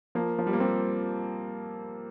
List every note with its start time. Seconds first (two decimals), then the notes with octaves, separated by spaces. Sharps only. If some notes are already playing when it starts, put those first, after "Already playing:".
0.15 F3 A#3
0.39 F3
0.46 G3
0.53 A#3
0.60 G3 C4